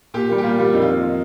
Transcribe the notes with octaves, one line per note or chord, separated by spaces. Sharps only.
A#2 G4
G3 A#3
G4
A#2 F4
G3 A#3 F4
F2 D#4
F4
D#3 A#3 D#4
F4